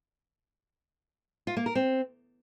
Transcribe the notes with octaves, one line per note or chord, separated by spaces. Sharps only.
F4
A#3
A#4
C4